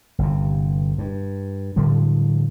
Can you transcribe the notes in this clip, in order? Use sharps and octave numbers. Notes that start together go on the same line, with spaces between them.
G1 C3
G2
A2 D3 F3 G3